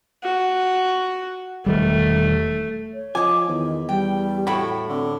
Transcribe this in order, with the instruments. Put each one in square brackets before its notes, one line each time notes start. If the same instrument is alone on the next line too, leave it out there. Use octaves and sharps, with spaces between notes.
[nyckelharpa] F#4
[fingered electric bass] E1 D#3 G3 [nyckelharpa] A3
[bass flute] C#5
[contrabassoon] F3 [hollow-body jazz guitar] D#5 G#5 [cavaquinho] D6
[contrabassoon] E2 [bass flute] D#3
[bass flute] G3 [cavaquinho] G5
[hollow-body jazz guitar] A2 G5 B5 [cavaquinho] F#4 E5
[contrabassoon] D3 [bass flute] C4